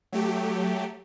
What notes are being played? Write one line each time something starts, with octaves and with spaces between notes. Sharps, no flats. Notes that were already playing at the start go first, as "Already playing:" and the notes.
F#3 A3 G4